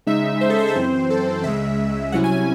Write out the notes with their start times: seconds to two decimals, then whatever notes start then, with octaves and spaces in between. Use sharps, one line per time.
0.06 C#3 G#3 D#4 E5
0.41 C5
0.50 A4
0.59 C5
0.67 A4
0.76 F#2 E3 C4 C5
1.10 A4
1.44 C#2 C#3 G#3 E5
2.12 C2 C3 F#3 C#4 E4 F#5
2.24 G#5
2.36 G#5